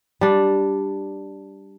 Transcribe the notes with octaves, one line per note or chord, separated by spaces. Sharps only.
G3 D4